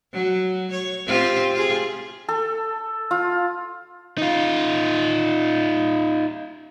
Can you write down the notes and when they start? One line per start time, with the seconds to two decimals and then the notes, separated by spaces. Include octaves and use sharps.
0.13 F#3
0.71 C#5
1.06 C4 F4 G4
1.53 F4 G#4
2.29 A4
3.11 F4
4.18 D#4 F4